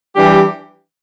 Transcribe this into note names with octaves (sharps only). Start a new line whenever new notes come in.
E3 G3 D4 G4